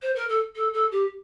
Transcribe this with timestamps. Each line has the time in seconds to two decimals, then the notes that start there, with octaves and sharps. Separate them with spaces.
0.02 C5
0.15 A#4
0.29 A4
0.55 A4
0.73 A4
0.91 G4